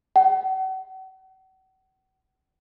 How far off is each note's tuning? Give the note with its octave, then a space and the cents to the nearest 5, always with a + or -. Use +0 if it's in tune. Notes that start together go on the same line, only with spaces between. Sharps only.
F#5 +40